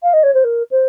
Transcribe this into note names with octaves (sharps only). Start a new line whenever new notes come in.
F5
D#5
C#5
C5
A#4
C5